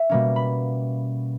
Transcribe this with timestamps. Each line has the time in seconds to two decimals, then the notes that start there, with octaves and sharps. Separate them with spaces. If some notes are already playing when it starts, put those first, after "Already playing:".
Already playing: E5
0.09 B2 G3 A#3 C#4
0.36 B5